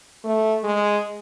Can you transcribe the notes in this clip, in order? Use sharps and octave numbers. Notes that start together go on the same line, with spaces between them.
A3
G#3